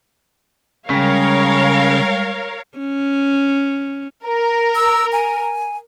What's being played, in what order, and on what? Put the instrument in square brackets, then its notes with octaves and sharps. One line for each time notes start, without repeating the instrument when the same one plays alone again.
[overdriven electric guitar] C#3 [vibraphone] G3 G#3 [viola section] A#4 C#5 F5
[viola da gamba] C#4
[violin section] A#4
[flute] E6
G#5